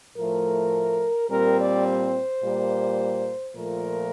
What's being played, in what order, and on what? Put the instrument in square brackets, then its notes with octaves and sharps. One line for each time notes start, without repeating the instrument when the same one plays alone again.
[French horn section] A2 F3 A3 A#4
A#2 G3 C4 A#4
D5
C5
A#2 G3 A#3
A#2 F3 A3 A#4